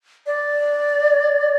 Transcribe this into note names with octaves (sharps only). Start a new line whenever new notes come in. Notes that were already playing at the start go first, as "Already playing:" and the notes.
D5